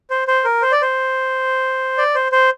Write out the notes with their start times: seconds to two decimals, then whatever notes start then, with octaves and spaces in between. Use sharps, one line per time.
0.10 C5
0.28 C5
0.45 A#4
0.62 C5
0.72 D5
0.82 C5
1.98 D5
2.15 C5
2.32 C5